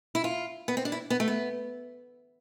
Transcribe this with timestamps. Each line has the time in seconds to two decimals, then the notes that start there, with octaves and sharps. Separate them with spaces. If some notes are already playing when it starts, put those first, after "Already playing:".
0.15 E4
0.24 F4
0.68 B3
0.77 C4
0.85 D4
0.92 E4
1.10 B3
1.20 A3
1.28 B3